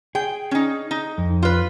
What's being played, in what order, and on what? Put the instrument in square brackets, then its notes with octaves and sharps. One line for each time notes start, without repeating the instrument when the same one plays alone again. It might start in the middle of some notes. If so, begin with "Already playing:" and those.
[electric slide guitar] G#4 [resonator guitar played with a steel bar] G5
[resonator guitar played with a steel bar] C#4 D#4
D#4
[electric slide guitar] F2
[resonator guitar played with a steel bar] F4 B4